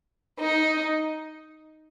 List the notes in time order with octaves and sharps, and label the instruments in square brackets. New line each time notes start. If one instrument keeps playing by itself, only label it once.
[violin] D#4